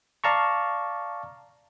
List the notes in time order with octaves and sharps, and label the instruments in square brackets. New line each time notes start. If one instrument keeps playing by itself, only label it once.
[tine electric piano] D5 F5 A5 A#5 C#6